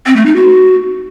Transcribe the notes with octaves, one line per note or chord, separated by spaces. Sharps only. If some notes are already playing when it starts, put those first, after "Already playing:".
C4
A3
D#4
F#4